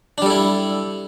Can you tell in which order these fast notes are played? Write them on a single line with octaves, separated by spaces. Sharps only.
D4 G3 A4 E4